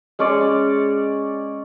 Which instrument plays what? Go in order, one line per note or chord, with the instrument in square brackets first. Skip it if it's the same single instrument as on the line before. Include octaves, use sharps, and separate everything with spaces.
[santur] G#3 C#4 C#5 D5